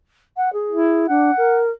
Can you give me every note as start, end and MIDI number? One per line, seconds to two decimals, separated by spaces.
0.37 0.52 78
0.53 1.05 68
0.70 1.04 64
1.09 1.31 62
1.09 1.58 78
1.37 1.70 70